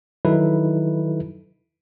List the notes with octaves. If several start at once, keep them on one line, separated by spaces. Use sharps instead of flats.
D#3 F#3 D#4 E4 A4 B4